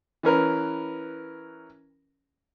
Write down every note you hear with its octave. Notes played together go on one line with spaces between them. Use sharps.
E3 C#4 A#4 B4